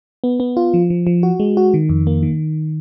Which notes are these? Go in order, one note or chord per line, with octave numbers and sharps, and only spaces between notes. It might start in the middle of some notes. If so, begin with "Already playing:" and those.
B3
B3
F4
F3
F3
F3
F#4
G#3
F#4
D#3
F2
A#3
D#3